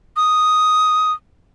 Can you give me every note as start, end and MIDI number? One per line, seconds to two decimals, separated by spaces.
0.17 1.12 87